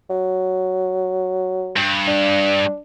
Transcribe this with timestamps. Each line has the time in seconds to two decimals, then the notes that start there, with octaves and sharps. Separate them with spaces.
0.10 F#3
1.76 G2
2.07 D4